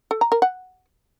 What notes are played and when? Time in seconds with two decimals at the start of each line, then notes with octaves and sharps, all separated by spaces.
0.11 A4
0.21 A#5
0.32 A#4
0.42 F#5